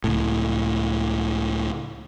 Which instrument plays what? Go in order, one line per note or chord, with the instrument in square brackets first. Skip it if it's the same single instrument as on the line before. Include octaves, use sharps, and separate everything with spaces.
[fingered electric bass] C#2 A2